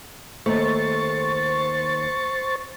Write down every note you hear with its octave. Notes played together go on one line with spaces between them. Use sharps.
D#2 A3 C5 C#6 A6